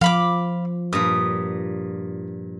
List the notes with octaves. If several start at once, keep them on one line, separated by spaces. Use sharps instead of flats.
F3 F5 B5 D6
G2 A#2 D#6